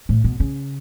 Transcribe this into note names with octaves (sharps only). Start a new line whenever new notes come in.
A2
B2
C#3